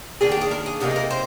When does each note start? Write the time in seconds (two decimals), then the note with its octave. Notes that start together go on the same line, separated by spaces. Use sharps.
0.21 D#3 A#3 D4 G#4
0.31 G4
0.41 G#4
0.51 A#4
0.66 G#4
0.81 C3 F3 A#3 D#4 G#4
0.91 G#4
0.96 A#4
1.11 C5